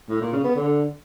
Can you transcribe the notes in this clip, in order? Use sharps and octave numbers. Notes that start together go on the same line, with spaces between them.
A2
A#2
C#3
B3
D3